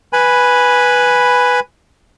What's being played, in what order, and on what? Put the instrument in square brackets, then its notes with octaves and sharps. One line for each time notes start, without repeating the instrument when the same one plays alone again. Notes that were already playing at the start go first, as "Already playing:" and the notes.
[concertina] B4 G#5 B5